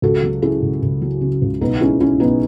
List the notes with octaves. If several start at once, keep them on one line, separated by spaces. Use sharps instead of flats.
C#2 F#4 A4
F#3
C#3 E4 G#4
C#2
C#2
F#3
C#3
C#2
B1 B3 D#4
G#3 C#4 E4
B2 C#4 E4
B1 B3 D#4